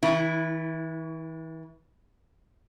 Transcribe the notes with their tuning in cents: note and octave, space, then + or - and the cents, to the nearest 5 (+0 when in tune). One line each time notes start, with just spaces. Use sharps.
E3 -40 E4 +0